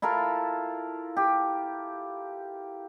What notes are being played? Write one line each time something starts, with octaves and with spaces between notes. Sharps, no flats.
E4 F4 A4 A#4
G4